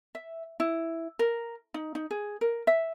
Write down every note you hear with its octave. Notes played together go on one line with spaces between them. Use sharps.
E5
E4
A#4
D#4
D#4
G#4
A#4
E5